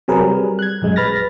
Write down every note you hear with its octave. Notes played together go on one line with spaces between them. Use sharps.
C3 F#3 G#4 A#4 B4
G3
F#6 G#6
A#1 F#2 G#3
B4 B5 F6 A6 A#6